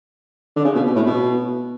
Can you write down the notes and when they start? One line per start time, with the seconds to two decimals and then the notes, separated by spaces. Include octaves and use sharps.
0.56 D3
0.64 C#3
0.75 B2
0.85 B2
0.96 A2
1.06 B2